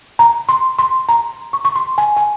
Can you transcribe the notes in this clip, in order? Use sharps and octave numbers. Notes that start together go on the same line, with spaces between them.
A#5
C6
C6
A#5
C#6
C#6
C6
G#5
G#5